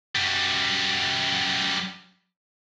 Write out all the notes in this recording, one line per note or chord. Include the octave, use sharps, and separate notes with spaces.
F#2 G3